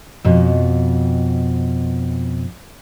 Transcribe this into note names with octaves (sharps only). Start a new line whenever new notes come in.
F2 B2